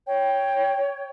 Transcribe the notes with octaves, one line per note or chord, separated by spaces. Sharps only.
C#5 G5